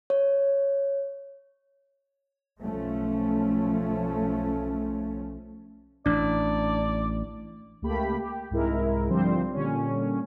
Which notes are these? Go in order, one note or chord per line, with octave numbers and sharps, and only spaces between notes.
C#5
B1 F3 A3 C#4
A1 D4 D5
C#2 A3 A#3 G4 B5
G4
C2 G#2 G#3 E4 A#4
D3 F3 G3 C4 C5
A#2 D3 G3 C#4